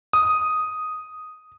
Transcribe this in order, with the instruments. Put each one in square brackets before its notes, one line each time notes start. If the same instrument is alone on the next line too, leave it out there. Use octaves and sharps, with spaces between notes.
[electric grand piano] D#6